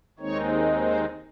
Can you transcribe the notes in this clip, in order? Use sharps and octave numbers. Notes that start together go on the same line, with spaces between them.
D#2 D#3 G#3 C4 D#4 C#5
C5